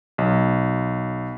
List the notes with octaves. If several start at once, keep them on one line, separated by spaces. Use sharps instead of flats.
B1